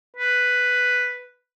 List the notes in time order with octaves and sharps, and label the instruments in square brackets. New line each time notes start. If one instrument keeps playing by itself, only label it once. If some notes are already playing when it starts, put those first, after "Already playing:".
[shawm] B4